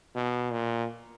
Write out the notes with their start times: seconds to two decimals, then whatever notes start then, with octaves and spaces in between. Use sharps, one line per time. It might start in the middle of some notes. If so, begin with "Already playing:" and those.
0.15 B2
0.52 A#2